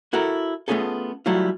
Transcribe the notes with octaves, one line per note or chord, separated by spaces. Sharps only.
E4 F#4 A4 A#4
A3 B3 C#4 F4 G#4 A4
F#3 G3 A3 E4 F4